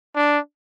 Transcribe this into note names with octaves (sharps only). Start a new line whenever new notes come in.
D4